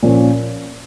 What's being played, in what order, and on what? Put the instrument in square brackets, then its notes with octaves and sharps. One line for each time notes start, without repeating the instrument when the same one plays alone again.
[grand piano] A#2 F3 C#4